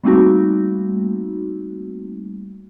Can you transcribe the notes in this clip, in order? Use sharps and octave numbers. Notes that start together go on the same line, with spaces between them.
G3 A3 A#3 C4 D#4 F#4